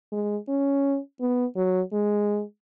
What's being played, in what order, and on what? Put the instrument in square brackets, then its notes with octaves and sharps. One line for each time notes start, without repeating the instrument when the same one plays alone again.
[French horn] G#3
C#4
B3
F#3
G#3